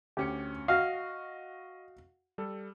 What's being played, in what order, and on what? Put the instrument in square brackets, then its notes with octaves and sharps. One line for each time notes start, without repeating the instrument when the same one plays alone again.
[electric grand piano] D2 C#4 C#7 [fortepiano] G4
[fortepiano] F#4 F5 [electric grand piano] D#5
[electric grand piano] G3 A4